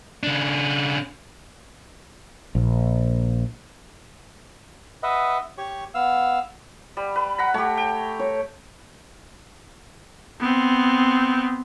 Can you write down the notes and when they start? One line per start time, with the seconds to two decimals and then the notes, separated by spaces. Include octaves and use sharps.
0.23 C#3 D4
2.55 A#1
5.03 B4 D#5 E5 F#5
5.58 G4 C#5 C#6
5.94 B3 F5 E6
6.97 G3
7.16 B4
7.38 F#5 A#5 B5
7.54 A3 G4 C#5
7.77 G5
8.19 C#5
10.40 B3 C4